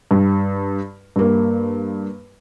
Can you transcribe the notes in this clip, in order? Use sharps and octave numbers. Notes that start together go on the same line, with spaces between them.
G2
G2 A#3